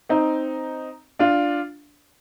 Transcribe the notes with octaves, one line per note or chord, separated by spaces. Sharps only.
C4 D#4
D4 F4